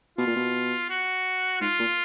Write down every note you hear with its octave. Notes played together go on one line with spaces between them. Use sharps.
B2 F4
A#2
B2
F#4
G#2 F4
A#2